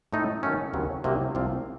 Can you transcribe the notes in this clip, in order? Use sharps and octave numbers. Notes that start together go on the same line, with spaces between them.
A2 A3 D#4 A4
D#3 F#3 A3 C#4
D#2 C#3 F#3 C4
C2 C3 F#3 A#3 D#4
C2 C3 F3 C4 F4